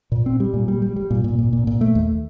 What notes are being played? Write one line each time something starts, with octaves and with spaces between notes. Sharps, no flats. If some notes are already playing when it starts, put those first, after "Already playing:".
A#2
C4
G3
A#2
G3
G3
G3
A#2
A#2
A#2
A#2
A#2
A3
D#2